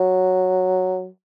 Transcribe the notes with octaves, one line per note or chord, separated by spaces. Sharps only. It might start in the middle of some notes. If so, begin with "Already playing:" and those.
Already playing: F#3